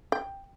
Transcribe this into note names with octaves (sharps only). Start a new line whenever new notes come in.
G5